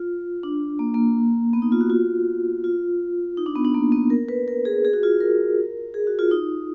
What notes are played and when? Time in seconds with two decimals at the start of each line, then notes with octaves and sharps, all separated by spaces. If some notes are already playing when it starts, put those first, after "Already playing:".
Already playing: F4
0.43 D4
0.79 A#3
0.94 A#3
1.53 B3
1.62 D#4
1.72 F4
1.81 F#4
1.90 F4
2.64 F4
3.37 D#4
3.46 D4
3.55 B3
3.65 D4
3.75 A#3
3.92 B3
4.10 A#4
4.29 B4
4.48 A#4
4.65 G#4
4.85 G#4
4.93 F#4
5.03 F4
5.21 A#4
5.94 G#4
6.07 F#4
6.19 F4
6.31 D#4